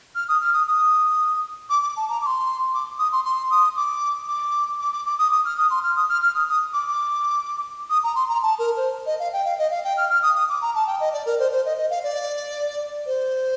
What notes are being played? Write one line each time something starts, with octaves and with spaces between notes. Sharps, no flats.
F6
D#6
F6
D#6
D#6
D6
D6
A5
A#5
D6
C6
D6
D#6
C6
C6
D#6
D6
D6
D6
D6
D6
D#6
D#6
F6
D#6
C6
F6
D#6
F6
F6
D#6
D#6
D6
D6
D#6
A#5
C6
A#5
A5
A#4
C5
D#5
F5
G5
F5
D#5
F5
G5
F6
F6
D#6
D#6
D6
A#5
A5
G5
D#5
D5
A#4
C5
C5
D#5
D#5
F5
D5
C5